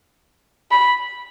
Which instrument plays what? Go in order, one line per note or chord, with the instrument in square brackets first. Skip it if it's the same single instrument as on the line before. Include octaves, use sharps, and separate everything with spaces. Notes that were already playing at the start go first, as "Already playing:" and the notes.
[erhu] B5